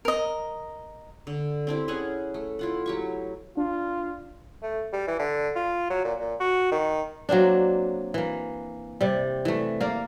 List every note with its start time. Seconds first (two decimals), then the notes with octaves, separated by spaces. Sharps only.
0.05 A#4 D#5
1.27 D3
1.67 C4 D4 E4 G4
1.88 C#4 G#4 F#5 G#5
2.34 A3
2.59 E4 F4 F#5
2.86 F#3 G4 C#6
3.57 D4 F4
4.63 A3
4.93 G3
5.08 E3
5.19 D3
5.55 F4
5.90 F#3
6.04 A#2
6.20 A#2
6.40 F#4
6.72 D#3
7.29 F#3 A#3 C4 D4
8.14 E3 A#3
9.01 C3 G3
9.45 E3 A3
9.81 A#3 D5 F5